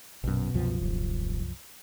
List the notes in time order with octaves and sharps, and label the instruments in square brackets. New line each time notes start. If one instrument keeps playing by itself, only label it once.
[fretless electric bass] A#1 F#2 [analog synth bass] B2
[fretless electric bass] C2 F#2 F3
[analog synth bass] D#1